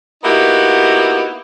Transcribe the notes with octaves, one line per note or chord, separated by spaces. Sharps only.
A#3 B3 D#4 E4 F#4 G4